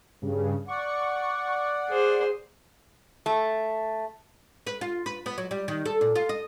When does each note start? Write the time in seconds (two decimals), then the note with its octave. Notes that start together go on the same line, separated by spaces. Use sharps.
0.22 G2 C#3
0.68 D5 F#5 C#6
1.88 G#4 C5
3.26 A3
4.67 B4
4.81 F4
5.06 B4
5.26 B3
5.38 F#3
5.51 G3
5.68 D#3
5.86 A4
6.01 A#2
6.15 F4
6.29 D#5